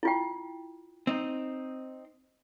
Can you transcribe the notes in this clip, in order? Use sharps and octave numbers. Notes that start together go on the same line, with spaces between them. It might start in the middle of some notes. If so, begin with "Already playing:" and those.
E4 F4 G5
C4 D#4